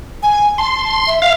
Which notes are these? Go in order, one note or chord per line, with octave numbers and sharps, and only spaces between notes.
G#5
A5 C6
E5
E5 F5